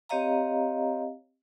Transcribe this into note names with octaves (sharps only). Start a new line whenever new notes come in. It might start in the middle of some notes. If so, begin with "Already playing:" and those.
C4 G4 C#5 D#5 F5 A#5